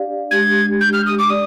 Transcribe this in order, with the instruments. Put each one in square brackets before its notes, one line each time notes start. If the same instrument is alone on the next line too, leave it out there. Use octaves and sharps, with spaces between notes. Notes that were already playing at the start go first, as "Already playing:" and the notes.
Already playing: [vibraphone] D4 G4 D5 F5
[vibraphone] G#3 D4 G4 [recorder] G#6
[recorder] G6
F6
D#6
D6
[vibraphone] D5 [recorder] D#6